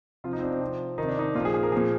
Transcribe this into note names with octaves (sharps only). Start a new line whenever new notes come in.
C3 F3 F4
D#4
C4
D4
C4
C3 F3
D#3 D#4
C3
D4
D#4
A#2 F4
F3 G#4
G#4
A#4
A#2 F3 G#4